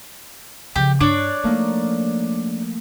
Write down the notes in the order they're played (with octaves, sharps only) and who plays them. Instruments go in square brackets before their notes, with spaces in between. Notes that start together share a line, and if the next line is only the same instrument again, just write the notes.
[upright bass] C#3 F3 [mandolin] G4
[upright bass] G2 [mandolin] D4 C#5 D5
[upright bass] F3 [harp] A3 A#3 D#4